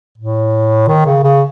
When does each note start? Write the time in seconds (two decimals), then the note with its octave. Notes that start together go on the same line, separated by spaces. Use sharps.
0.18 A2
0.88 D#3
1.06 C#3
1.24 C#3